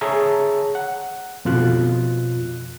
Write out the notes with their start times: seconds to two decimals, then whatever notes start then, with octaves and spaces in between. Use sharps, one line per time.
0.01 G#4 C#5 E5 A5 A#5
0.75 F#5
1.45 F2 B2 F4 F#6